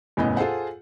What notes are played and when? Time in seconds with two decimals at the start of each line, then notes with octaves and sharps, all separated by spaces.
0.17 F#1 E2 A2 B3 C#4 D#5
0.37 F4 G#4 A4 C5 F#5